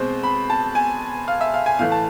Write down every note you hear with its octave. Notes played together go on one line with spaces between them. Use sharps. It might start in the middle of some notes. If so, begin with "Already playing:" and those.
Already playing: B2 G#3 C4 C5
B5
A5
G#5
F5
E5
F5
G#5
A2 E3 A3 F5
A5